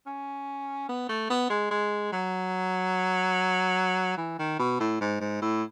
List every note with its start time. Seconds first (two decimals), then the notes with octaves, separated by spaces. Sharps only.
0.06 C#4
0.89 B3
1.09 A3
1.30 B3
1.50 G#3
1.71 G#3
2.12 F#3
4.17 E3
4.39 D#3
4.59 B2
4.80 A2
5.01 G#2
5.20 G#2
5.42 A2